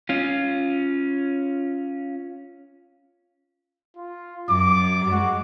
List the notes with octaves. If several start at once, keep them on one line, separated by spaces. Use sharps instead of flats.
C#4 F4
F4
F#2 D6
G#3 F#4